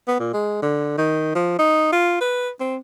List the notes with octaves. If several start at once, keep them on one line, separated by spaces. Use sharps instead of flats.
B3
A#2
G#3
D3
D#3
F3
D#4
F4
B4
C4